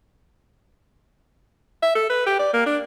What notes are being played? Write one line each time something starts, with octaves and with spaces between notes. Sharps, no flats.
E5
A4
B4
G4
D5
A#3
D4